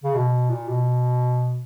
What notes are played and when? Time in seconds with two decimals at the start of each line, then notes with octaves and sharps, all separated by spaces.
0.04 C#3
0.15 B2
0.50 A#2
0.69 B2